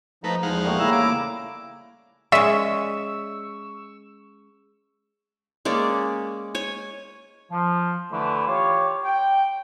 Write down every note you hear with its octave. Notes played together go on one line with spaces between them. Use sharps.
F3 A3 D#4 B4 A#5
E2 F3 G#3 D#4 F5 F#5
A#2 G3 A3
C#3 E4 A#5 E6
D6
G#3 C#4 D5 E5 C#6 E6
G#3 A#3 C#4 D5
C#5 G#5
F3
D3 E3 A3
F4 G4 C#5
G5